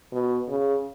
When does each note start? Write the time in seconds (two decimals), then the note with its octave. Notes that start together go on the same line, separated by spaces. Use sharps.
0.12 B2
0.49 C#3